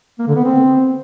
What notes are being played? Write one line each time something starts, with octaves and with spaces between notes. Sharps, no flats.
A#3
D3
B3
C4